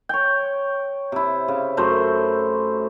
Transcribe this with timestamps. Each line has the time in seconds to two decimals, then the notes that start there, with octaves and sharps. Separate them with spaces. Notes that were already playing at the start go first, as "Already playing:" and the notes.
0.09 C#5 G5
1.12 C3 E4
1.48 C#3
1.77 F#2 A3 C5